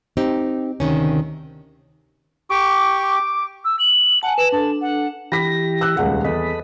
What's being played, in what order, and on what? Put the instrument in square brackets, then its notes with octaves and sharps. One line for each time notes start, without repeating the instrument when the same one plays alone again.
[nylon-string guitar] C4 D#4 G4
D2 C3 D#3 C#4
[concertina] G4 [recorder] C#6 [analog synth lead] D6
[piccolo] E6
F#7
[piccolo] F#5 [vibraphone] G#5 A5
[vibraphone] B4 [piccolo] E7
[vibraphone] D4 A4 [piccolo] A5
[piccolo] F#5
[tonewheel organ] E3 G4 A#6 [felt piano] B5 B6
[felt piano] E6 F#6
D#1 C#2 F#5
[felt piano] E2 [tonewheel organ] A4 D#5 B5